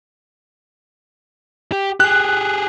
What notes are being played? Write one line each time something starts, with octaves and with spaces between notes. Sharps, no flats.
G4
G4 G#4 F#6